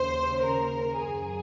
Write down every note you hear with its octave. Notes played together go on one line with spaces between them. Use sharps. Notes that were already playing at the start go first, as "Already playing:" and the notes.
Already playing: D#2 C#3 C5
A#4
F#2 C#3 G#4